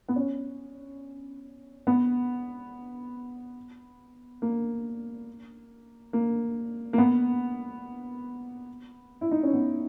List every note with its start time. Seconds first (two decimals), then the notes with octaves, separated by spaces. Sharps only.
0.08 B3
0.16 C#4
1.87 B3
4.42 A#3
6.13 A#3
6.93 A#3
6.98 B3
9.21 E4
9.31 D#4
9.43 C#4
9.53 B3